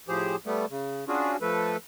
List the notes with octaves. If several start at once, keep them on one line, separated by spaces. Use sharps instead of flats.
A2 F3 G4 G#4 C5
G3 A3 B3
C#3
C#4 D4 F4 F#4 G#4
F3 A3 A4 B4